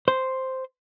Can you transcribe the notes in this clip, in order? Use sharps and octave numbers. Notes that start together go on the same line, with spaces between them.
C5